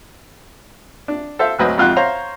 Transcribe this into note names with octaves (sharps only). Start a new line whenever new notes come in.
D4
A4 C5 E5 F5
G#1 D2 F#3 B4 C5 D#5
F2 G#2 F4 F#4 G5 F#6
C5 C#5 F5 A#5